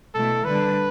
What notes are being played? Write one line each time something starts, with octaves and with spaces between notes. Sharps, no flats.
B2 A3 E4 A4
D3 G3 D4 B4